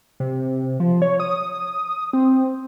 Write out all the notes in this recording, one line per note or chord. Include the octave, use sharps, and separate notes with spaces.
C3
F3
C#5
D#6
C4